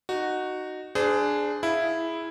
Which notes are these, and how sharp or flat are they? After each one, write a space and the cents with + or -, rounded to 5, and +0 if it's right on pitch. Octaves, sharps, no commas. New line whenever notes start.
D#4 -15 F#4 +0
D4 +0 G#4 +10 C5 -35
E4 +0 G#4 +0 F5 +10